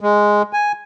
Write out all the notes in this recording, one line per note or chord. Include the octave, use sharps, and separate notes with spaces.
G#3
G#5